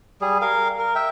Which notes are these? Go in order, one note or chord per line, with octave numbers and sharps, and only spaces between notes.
G3 G#4
A#4 F5
A#4
E5 G5